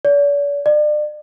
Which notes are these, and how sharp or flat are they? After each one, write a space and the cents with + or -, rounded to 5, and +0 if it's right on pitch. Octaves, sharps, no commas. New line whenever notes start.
D5 -45
D5 +35